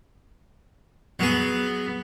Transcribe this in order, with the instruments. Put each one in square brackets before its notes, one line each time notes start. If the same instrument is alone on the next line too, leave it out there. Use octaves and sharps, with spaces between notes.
[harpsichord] F#3 G#4 [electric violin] B3